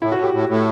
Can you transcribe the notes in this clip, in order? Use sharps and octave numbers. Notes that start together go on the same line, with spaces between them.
A2 E4
F#4
A2 G4
A2
A2